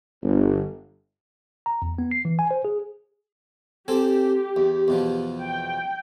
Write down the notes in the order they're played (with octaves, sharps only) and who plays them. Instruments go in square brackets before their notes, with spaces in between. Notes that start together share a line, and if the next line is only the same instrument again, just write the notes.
[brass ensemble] G1
[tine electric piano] A#5
E2
B3
C7
E3
G#5
C5
G#4
[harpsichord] C4 A4 G#5 [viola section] G4
[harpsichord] E2
E2 B2 F3
[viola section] G5